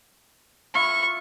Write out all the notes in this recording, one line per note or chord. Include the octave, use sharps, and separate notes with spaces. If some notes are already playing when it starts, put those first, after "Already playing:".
E4 F4 C#6